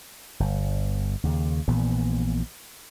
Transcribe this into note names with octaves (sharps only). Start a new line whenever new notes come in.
G1
D#2 C#3
A#1 A#2 E3 B3